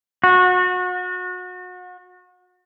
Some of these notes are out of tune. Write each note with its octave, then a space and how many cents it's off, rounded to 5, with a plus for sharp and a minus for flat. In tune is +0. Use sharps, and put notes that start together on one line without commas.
F#4 -30